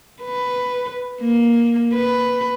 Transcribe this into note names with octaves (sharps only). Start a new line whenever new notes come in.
B4
A#3
B4